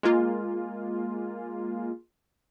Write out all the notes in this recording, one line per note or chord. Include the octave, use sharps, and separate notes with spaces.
G#3 A#3 F4